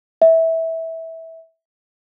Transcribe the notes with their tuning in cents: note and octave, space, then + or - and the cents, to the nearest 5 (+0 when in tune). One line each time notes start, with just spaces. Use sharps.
E5 -15